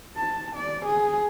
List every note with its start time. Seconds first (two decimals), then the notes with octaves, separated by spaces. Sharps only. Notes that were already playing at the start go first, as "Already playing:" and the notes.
0.17 A5
0.56 D5
0.86 G#4